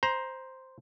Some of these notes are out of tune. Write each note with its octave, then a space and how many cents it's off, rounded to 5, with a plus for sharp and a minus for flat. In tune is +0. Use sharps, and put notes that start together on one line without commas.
C5 +0 A#5 +20